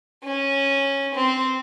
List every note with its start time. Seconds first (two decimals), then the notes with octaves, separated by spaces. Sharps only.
0.25 C#4
1.15 C4